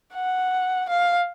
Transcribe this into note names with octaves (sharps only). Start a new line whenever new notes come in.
F#5
F5